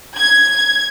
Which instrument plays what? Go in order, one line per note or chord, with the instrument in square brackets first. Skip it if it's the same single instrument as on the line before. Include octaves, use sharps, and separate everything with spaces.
[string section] G#6